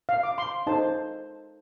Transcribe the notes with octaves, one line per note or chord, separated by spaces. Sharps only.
F5
D6
C6
D#4 A4 C5 A5